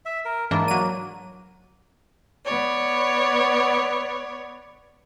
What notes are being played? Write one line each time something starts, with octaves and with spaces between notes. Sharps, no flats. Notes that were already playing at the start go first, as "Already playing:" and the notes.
E5
A#4
G#2 E3 A#3 D4
F#3 D#7
B3 C#5 D5